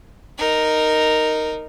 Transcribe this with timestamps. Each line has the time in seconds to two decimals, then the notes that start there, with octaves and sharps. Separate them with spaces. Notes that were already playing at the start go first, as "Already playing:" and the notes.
0.38 D#4 A#4